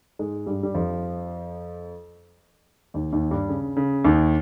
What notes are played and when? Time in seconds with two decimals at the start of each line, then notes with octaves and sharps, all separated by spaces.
0.19 G#2 G#3
0.47 G2 G3
0.63 G3
0.74 F2 F3
2.94 D#2 D#3
3.13 D#2 D#3
3.31 G2 G3
3.49 C#3
3.77 C#3
4.04 D#2 D#3